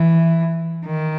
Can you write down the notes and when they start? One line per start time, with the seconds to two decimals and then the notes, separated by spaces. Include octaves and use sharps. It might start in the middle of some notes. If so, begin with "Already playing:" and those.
Already playing: E3
0.85 D#3